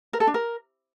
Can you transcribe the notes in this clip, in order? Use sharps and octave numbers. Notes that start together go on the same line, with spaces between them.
A#4
A4
D4
A#4